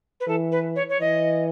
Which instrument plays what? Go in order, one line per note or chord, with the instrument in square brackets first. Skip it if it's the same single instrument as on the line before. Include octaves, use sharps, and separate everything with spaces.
[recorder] B4
[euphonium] E3 [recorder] A4
[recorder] B4
C#5
C#5
[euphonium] E3 [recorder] D#5